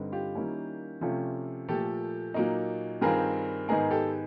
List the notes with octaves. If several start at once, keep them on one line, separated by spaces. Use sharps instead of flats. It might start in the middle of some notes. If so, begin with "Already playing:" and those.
Already playing: G2 D3 G3 C4 D#4
F4 G4
D#3 G3 A#3 C#4 E4
C3 F3 A3 C#4 F4
A#2 F3 A3 G4 A4
A#2 F#3 A#3 D#4
G2 D#3 G3 C4 F4 G#4 A#4
G#2 D#3 G#3 B3 G#4 A#4
G4 A4